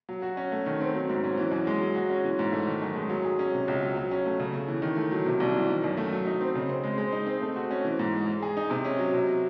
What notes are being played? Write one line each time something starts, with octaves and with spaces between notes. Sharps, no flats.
F#3
F#4
C#4
A3
D#3
C4
F#3
G#2
C#4
E3
F#2
G#3
F#3
F#4
C#4
E3
G#2
A3
D#3
F#2
G#3
F#3
G#4
C#4
C3
C#2
F#3
F#3
C#4
A3
C#3
A3
E3
D#3
A3
F#3
C3
C2
E3
D#3
F#2
A3
F#3
D#4
C4
C#3
C4
G#3
G#3
D#4
C4
A3
F#4
C#4
E3
G#2
G#3
G#3
G#4
D#4
C3
C#4
F#3
C3